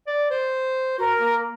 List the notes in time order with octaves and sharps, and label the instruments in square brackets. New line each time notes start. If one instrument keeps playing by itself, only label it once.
[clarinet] D5
C5
[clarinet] F#4 [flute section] A#4
[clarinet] A#3